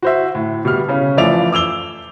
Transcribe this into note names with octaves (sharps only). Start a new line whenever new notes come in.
F#4 C5 E5
A2
B2 G3 E4 F6
C#3 C#4
E3 F3 A3 D5 E5 F7
D6 E6 F7 G7